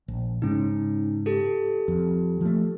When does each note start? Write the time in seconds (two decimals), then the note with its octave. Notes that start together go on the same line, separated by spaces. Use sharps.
0.08 A#1
0.42 G#2 C#3 C#4 D#4
1.26 G4 A4
1.88 F2
2.41 F3 A3